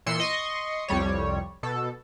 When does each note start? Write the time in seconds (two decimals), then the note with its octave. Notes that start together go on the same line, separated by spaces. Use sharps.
0.06 A#2 E3 C6 E6 C#7
0.20 D#5 C6 C#6
0.88 C2 F2 G3 C#5
1.63 B2 A4